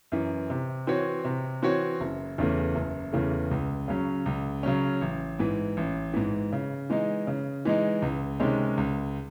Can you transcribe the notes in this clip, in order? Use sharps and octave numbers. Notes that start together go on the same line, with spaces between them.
F#2 E3
C3
E3 C4 F#4 C#5
C3
E3 C4 F#4 C#5
F#1
E2 C#3 E3 A3
F#1
E2 C#3 E3 A3
C#2
C#3 F#3 C#4
C#2
C#3 F#3 C#4
A1
G#2 E3
A1
G#2 E3
C#3
E3 G#3 D#4
C#3
E3 G#3 D#4
C#2
C3 D#3 G#3 C#4
C#2